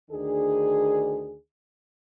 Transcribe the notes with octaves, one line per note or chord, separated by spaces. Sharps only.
D2 D#3 D4 G#4